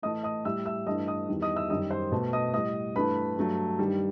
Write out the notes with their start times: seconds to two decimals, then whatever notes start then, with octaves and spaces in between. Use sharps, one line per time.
0.02 A2 E3 A3 D#5 D#6
0.23 D#5 D#6
0.45 A2 G3 E5 E6
0.66 E5 E6
0.86 G2 E3 A3 D#5 D#6
1.07 D#5 D#6
1.29 E2 D#3 G3
1.42 D#5 D#6
1.56 E5 E6
1.70 F#2 D#3 G3 D#5 D#6
1.90 C5 C6
2.12 B2 A3
2.33 D#5 D#6
2.53 A2 G3 D#5 D#6
2.95 G2 E3 A3 B4 B5
3.37 G2 F#3 A3
3.79 G2 D#3 G3